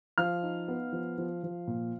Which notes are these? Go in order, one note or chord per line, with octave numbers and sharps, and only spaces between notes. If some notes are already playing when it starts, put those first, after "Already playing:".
F3 F5 F6
D#4
B3
F3
F3
F3
A#2